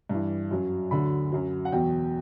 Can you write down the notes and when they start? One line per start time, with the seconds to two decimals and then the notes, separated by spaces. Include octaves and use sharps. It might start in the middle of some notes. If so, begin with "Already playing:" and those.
0.09 G2 E3
0.51 F#2 F#3
0.91 D2 D3 F#3 B5
1.32 F#2 F#3
1.65 F#5
1.72 E2 B2 F#3 G5